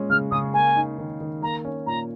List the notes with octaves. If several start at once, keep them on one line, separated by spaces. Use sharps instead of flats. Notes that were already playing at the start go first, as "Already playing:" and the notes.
Already playing: A#2 G#3 C#4
C#3 F6
C#3 D#6
A#3 G#5
D#4
D#3
D#3
A#3 A#5
C#4
A#2 A#5